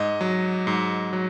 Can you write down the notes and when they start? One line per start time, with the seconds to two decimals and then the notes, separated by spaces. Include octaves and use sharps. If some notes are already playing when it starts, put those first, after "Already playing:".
Already playing: G#2 D#5
0.21 F#3
0.67 G#2
1.13 F#3